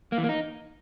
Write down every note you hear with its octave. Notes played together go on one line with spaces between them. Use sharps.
A#3
E3
A#3
D#4